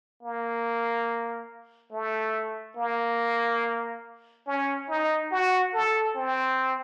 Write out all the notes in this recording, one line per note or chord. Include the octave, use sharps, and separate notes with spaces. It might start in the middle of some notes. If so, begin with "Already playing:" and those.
A#3
A3
A#3
C#4
D#4
F#4
A4
C4